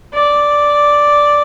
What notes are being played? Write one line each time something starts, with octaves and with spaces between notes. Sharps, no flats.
D5